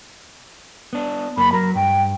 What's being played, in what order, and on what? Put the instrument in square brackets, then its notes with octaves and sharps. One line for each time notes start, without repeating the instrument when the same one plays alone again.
[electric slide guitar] B3 D4
[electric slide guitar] F#2 A#3 [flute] B5
[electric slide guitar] F#3 [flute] A#4
[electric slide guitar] G2 [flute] G5